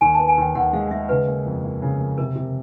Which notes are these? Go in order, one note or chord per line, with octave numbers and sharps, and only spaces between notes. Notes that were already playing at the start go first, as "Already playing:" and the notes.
D#2 G#5
A5
B3
G#5
D#2 G5
D#2 F#5
G#3 F5
G#3 E5
C#3 B4
A#3
F2
A#3
C#3
A#3
C3 A#4
C3